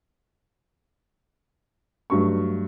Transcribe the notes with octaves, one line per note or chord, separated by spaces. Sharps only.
G2 F#3 A3 C#6